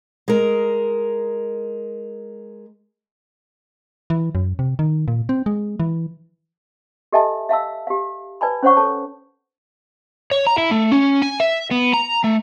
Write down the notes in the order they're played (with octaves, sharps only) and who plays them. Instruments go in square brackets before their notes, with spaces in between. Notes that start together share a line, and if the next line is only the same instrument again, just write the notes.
[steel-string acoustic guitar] G#3 A#4
[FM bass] E3
F#2
C3
D#3
A#2
C4
G#3
E3
[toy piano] G4 A4 D#5 E5 G#5 A5
E5 F5 A5 E6
G4 F5
B4 D5 G#5 A5 B5
C#4 C5 C#5 F#5 C#6
A4 C#5 A5
[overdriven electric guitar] C#5
A#5
E4
A3
C#4
G#5
E5
B3
A#5
A3